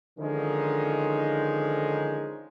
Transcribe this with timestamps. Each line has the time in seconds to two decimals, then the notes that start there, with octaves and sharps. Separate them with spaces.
0.18 D3 D#3 F3 G#3 C#4 D#4